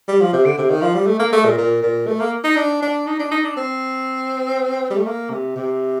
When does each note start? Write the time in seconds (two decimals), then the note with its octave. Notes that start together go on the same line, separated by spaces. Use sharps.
0.08 G3
0.21 F3
0.33 C3
0.45 D3
0.58 C3
0.70 D#3
0.82 F3
0.95 G3
1.07 A3
1.19 A#3
1.33 A3
1.45 A#2
1.58 A#2
1.83 A#2
2.07 A3
2.20 A#3
2.44 D#4
2.56 D4
2.82 D4
3.07 D#4
3.20 D4
3.31 D#4
3.44 D4
3.57 C4
4.90 G3
4.98 A3
5.06 A#3
5.30 C3
5.56 C3